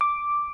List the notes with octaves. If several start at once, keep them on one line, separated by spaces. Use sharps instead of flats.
D6